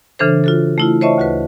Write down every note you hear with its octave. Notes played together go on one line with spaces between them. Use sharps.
C#3 E3 D4 A4 C5
F4 F#4 A4
A3 E4 F4
C5 C#5 D#5 E5 A5 C#6
D2 F#4 B4